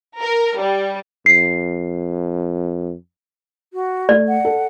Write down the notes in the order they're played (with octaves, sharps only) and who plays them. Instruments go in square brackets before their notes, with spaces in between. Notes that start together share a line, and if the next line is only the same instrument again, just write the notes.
[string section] A#4
G3
[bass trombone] F2 [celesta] C7
[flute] F#4
[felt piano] A3 [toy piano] D5
[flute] F#5
[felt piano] A4